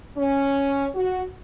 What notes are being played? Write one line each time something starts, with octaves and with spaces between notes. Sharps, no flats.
C#4
F#4